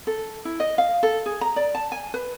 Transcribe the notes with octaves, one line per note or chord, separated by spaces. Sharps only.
A4
E4
D#5
F5
A4
G#4
A#5
D5
A5
G#5
B4